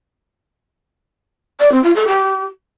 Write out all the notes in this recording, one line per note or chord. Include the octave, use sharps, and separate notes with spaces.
D5
C4
F4
A4
G4